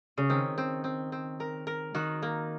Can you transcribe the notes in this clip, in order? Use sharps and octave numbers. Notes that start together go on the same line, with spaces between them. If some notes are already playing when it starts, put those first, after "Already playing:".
C#3
D#3 C4
C4
C4
C4
A#4
A#4
D#3 F#4
A#3